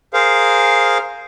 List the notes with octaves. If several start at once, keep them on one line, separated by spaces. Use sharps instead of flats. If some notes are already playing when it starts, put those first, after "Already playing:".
G#4 A#4 C5 F5